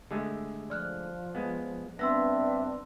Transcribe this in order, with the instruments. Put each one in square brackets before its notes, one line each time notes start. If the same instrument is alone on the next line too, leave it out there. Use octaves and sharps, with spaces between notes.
[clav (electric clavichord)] D3 G#3 A3 [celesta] G4 A4
[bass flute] F3 [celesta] D5 F6 F#6
[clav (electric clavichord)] G#3 B3
[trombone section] G2 C4 D4 [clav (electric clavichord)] B3 [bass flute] E5 [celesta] C6 E6 A#6